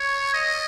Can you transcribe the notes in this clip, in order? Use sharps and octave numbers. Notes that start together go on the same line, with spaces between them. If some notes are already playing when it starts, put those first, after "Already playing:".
Already playing: C#5
D#5